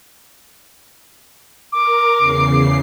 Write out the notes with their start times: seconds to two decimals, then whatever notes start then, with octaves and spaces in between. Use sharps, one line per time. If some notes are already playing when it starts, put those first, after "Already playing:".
1.72 A#4 D6
2.16 E2 C#3 C7